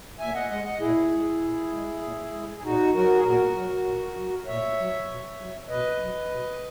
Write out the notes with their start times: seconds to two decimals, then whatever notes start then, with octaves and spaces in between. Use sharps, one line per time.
0.19 A#2 E5 G#5
0.34 D#5 F#5
0.50 G#3 D#5 F#5
0.64 D#5 F#5
0.80 A#2 E4 G#4
1.10 G#3
1.42 A#2
1.71 G#3
2.02 A#2
2.32 G#3
2.56 G#4
2.63 A#2 D#4 F#4
2.94 F#3 F#4 A#4
3.15 G#4
3.25 A#2 F#4 A#4
3.55 F#3
3.86 A#2
4.15 F#3
4.46 A#2 C#5 E5
4.77 F#3
5.07 B2
5.38 F#3
5.68 B2 B4 D#5
5.99 F#3
6.30 B2